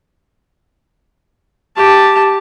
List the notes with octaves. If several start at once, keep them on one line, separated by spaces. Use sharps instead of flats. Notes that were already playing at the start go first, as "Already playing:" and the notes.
G4 A5